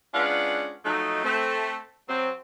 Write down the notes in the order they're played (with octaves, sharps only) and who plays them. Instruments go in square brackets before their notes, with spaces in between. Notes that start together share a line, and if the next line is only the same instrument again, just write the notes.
[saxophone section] G#3 C#4 D4 F4 B4 F#5
F3 F#3 A3 D#4
A3 C4
F#3 C4